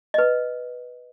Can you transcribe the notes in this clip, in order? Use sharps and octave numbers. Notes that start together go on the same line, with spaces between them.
B4 D#5